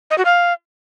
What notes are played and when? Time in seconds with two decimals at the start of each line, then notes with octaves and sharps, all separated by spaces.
0.11 D#5
0.18 F#4
0.25 F5